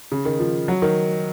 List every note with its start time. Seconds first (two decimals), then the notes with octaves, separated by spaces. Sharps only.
0.12 C#3
0.25 D#3
0.40 F3
0.68 F#3
0.82 D#3